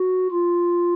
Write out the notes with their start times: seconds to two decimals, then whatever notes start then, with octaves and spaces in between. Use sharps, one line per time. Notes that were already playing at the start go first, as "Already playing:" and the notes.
Already playing: F#4
0.31 F4